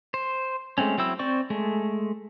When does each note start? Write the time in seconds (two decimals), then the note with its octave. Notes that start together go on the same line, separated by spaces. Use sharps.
0.14 C5
0.78 G#3 A3 C4 C#4
0.98 F#3 C4 E4 E6
1.19 C4 C5 D5 C#6
1.50 G#3 A3